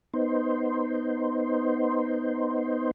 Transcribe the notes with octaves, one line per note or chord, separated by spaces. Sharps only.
B3 D#4 C5